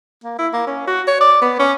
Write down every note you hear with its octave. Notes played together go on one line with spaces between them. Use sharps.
A#3
E4
A#3
C#4
F#4
C#5
D5
B3
C#4